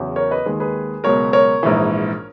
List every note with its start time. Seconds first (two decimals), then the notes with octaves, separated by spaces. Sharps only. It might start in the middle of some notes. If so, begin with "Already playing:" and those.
Already playing: E2 C#3 F#3
0.16 A#4 C#5
0.31 B4 D#5
0.46 D#2 D#3 G#3
0.60 G#4 B4
1.04 C#2 B2 F#3 A#4 C#5
1.33 A#4 C#5
1.63 A#1 G#2 E3